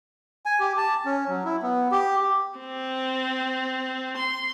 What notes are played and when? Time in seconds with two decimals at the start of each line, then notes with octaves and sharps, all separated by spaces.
0.46 G#5
0.60 G4
0.77 A5
1.05 C#4
1.28 F#3
1.44 E4
1.62 B3
1.92 G4
2.59 C4
4.17 C6